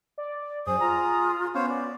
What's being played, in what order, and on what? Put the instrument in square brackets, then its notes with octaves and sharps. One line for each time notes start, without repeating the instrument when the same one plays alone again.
[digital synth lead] D5
[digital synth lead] F#2 [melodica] G#4 D#6 [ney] C5
[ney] F4 [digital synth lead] A#5
[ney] B3 [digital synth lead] C#4 [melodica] C5 C#5 F5
[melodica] D5